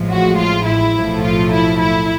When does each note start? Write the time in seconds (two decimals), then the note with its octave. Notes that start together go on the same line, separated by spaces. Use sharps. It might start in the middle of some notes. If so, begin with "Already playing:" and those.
Already playing: A1 A2 F3 G#3
0.12 F#4
0.39 F4
0.67 E4
0.96 B1 A2 F3 A3
1.24 F4
1.53 E4
1.80 E4